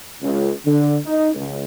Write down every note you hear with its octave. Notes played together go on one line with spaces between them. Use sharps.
C#2
D3
D#4
C#2